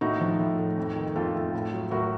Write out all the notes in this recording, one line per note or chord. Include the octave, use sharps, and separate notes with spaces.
A2 D#4 F#4
F3
A2
A3
F2
D#3
F2 F4 A4
A3
A2
F#3
A2 F#4 A#4